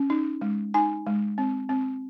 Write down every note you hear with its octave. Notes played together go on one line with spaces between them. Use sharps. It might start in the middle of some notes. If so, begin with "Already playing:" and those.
Already playing: C#4
D#4
G#3
D#4 G#5
G#3
C4
C4